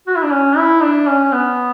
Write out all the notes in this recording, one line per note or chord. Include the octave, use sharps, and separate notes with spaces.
F#4
E4
D4
C#4
E4
D4
C#4
C#4
B3